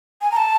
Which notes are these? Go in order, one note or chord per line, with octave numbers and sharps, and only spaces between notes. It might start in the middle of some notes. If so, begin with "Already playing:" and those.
G#5
A#5
A5